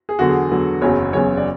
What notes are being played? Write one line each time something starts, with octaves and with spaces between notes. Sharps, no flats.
G#4
E2 D3 F#3 F#4
G#4
E2 D3 F#3
F#1 E2 C#3 F#3 C#5
F#1 E2 C#3 F#3 C#5
D5